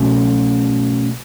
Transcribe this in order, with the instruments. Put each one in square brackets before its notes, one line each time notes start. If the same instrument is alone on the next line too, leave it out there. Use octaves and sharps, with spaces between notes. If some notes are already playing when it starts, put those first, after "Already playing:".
Already playing: [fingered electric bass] B2 A3 C#4